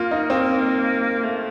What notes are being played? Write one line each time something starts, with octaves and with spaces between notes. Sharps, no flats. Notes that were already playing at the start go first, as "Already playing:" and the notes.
Already playing: A#3 F4
D#4
C4
A3